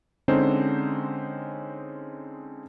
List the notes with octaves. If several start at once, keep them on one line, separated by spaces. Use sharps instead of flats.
D3 G#3 C4 C#4 D#4 C5